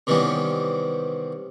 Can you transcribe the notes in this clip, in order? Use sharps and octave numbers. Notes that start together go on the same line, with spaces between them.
C3 D#3 E3 G3 B3 C#4